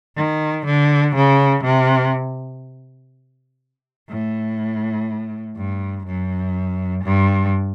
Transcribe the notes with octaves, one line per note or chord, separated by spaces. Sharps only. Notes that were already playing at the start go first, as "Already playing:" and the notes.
D#3
D3
C#3
C3
A2
G2
F#2
G2